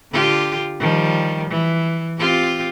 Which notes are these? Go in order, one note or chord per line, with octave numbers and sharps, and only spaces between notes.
D3 F4 G4
D#3 F3 G3
E3
C4 F4 G4